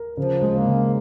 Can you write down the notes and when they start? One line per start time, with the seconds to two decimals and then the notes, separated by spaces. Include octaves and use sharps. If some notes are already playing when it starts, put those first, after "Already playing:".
Already playing: A#4
0.17 C#3 F3
0.42 G#3
0.54 A#3
0.66 C#3